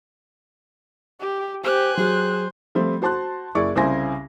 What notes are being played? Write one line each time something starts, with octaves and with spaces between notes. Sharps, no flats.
G4
G4 C5 G#5 F#6
F#3 G#4 C5
F3 G3 A3 C4
F#4 C5 A5 C6 F#6
F#1 E4 G#4 D5 C#6
C2 C#3 E4 C5 G#5 A#6